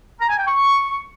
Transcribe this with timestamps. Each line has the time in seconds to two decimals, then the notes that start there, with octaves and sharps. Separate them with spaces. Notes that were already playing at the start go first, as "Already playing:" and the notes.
0.19 A#5
0.28 G#5
0.37 G5
0.46 C#6